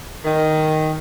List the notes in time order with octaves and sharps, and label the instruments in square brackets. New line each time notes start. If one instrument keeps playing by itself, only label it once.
[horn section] D#3